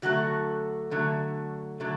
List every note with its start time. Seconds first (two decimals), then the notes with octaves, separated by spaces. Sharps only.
0.02 D3 F#3 A3 F#4
0.91 D3 F#3 A3
1.80 D3 F#3 A3